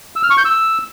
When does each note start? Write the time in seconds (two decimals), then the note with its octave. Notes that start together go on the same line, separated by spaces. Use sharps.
0.16 E6
0.23 F6
0.30 C#6
0.38 G6
0.45 E6